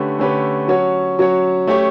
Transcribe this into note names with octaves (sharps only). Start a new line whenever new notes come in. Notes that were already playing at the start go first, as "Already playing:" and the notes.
Already playing: D3 A3 C#4 G4 B4
D3 A3 C#4 G4 B4
F#3 C#4 F#4 C#5
F#3 C#4 F#4 C#5
A3 C#4 G4 C#5